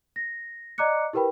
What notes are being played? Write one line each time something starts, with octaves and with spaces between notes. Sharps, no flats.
A#6
D5 D#5 A#5 D6 F#6 C#7
E4 G4 A#4 B4 G5 B5